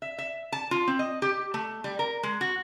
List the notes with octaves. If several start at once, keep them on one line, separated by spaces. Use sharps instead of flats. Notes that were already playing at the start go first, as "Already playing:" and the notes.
E5
E5
A5
F4
C4
D#5
G4
A3
G3
A#4
G#3
F#4